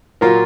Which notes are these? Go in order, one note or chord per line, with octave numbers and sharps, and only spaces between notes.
A#2 F#3 A#3 F4 A#4